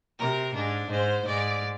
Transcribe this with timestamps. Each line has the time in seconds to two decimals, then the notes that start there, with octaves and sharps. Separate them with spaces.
0.20 C3 A#4
0.56 G#2 D4
0.91 G#2 C5
1.27 G#2 D5